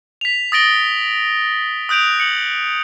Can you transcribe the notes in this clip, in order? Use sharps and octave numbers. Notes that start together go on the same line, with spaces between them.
B6 F7
D#6 A6 A#6 D7 G7
D#6 F#6 G6 D7 F7
C#7 F#7